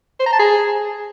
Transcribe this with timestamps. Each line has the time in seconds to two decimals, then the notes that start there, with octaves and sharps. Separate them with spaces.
0.19 C5
0.26 A#5
0.33 A5
0.39 G#4